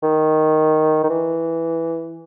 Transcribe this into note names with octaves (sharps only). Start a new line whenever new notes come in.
D#3
D#3
E3